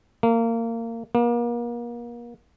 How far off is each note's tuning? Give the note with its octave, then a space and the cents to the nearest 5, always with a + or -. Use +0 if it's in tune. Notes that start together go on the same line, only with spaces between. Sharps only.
A#3 -25
A#3 +35